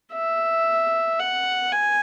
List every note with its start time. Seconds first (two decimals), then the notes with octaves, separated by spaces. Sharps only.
0.13 E5
1.20 F#5
1.72 G#5